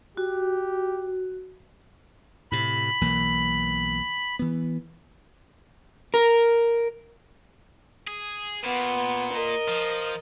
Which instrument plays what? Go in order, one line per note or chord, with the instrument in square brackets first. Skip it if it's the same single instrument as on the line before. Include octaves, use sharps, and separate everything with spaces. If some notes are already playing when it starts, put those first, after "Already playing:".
[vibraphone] F#4 [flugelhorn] G4
[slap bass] A2 C3 [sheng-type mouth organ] B5
[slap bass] B1 E3 A#3
E3 B3
[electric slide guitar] A#4
[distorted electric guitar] G#4
[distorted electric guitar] A#2 [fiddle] B3
[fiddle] A#4 D#5
[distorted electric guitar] F3